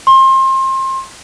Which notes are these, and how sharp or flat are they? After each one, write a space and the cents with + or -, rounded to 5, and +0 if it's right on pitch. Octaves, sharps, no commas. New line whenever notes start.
C6 +30